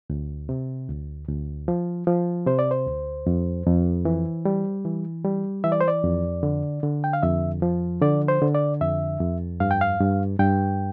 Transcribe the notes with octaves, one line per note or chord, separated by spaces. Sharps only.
D2
C3
D2
D2
F3
F3
C3 C5
D5
C5
D2
F2
F2
E3
G3
E3
G3
E3 E5
D5
C5
D5
F2
D3
D3
G5
F5
F2 E5
F3
D3 D5
C5
D3
D5
F2 E5
F2
G2 F5
G5
F5
G2
G2 G5